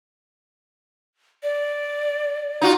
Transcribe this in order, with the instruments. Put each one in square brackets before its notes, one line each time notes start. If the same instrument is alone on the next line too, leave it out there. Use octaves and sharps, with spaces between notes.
[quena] D5
[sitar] D#4 F4 F#4